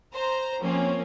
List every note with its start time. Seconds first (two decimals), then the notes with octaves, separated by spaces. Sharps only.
0.13 C5 A#5
0.61 F3 A#3 C4 C#4